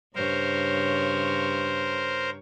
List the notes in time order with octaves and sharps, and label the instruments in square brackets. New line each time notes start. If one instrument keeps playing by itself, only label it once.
[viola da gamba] G2 C#3 C#5 [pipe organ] A#4 C5